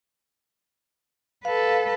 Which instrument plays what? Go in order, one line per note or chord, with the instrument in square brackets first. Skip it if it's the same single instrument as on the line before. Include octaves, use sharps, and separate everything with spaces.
[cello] A4 B4 [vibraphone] F5